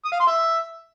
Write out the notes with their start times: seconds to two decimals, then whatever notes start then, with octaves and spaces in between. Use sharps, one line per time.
0.05 D#6
0.12 F5
0.20 C6
0.27 E5